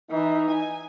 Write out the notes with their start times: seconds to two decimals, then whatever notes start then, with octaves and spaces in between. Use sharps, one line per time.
0.11 E3 D#4
0.51 G#5